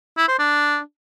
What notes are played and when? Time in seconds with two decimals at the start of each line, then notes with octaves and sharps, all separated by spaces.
0.17 E4
0.28 C5
0.39 D4